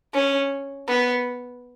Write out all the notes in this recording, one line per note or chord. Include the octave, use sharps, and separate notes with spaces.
C#4
B3